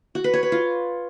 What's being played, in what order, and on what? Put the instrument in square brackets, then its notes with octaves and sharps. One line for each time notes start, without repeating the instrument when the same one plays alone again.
[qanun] F#4
B4
C#5
B4
F4